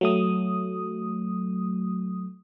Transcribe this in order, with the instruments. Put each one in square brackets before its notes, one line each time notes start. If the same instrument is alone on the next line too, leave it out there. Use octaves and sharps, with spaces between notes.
[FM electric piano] F#3 A3 D#6